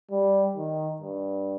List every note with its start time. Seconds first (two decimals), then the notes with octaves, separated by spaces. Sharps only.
0.11 G3
0.56 D#3
1.02 G2